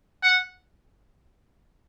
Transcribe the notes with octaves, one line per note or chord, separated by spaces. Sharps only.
F#5